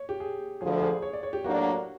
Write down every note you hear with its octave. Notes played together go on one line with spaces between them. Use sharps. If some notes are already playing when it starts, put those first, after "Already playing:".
Already playing: C#5
G4
G#4
D2 D3 F3 G#4
G#4
C#5
D5
C#5
G4
A2 F#3 A#3 D4 F#4